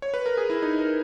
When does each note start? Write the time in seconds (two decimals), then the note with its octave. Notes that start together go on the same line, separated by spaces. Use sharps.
0.02 C#5
0.14 B4
0.26 A#4
0.37 G#4
0.50 E4
0.62 D#4
0.79 A#4